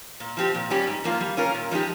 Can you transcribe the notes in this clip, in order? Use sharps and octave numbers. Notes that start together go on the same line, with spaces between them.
A#2
F3 C4 G4
A#2
G3 C#4 G4
G#2
F3 A#3 F4
G3
C#4 F4 A#4
A#2
F3 G#3 D#4 G4